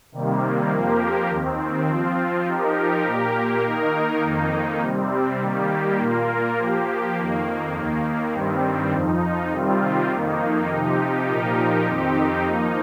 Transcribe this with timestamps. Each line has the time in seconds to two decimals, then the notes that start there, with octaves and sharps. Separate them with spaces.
0.12 C3 D#3 G3 A#3
0.70 F2 F3 A#3 G4 A#4
1.29 D#2 D#3 C4
1.87 F3 C4 F4
2.46 F3 D#4 G4 A#4
3.06 A#2 A#3 G4 A#4
3.64 D#3 A#3 D#4 A#4
4.22 F2 D#3 A#3 D#4
4.82 C3 G3 C4
5.40 D#3 G3 A#3 G4
5.99 A#2 A#3 F4 A#4
6.58 F3 A#3 G4
7.16 F2 D#3 A#3
7.75 D#2 D#3 A#3
8.33 G2 D#3 G3 C4
8.92 F2 F3 D#4
9.51 C3 D#3 G3 C4 F4
10.10 F2 D#3 A#3 D#4
10.69 C3 F3 D#4 G4
11.27 A#2 F3 D#4 G4 A#4
11.86 F2 D#3 C4 D#4 G4
12.44 F3 A#3 D#4